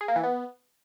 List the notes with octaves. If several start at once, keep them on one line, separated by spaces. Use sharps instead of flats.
G#4
A#3
E3
B3